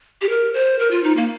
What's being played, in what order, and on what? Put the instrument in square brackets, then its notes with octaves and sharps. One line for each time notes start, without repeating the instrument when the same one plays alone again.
[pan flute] G4
A#4
C5
A#4
F4
D#4
A#3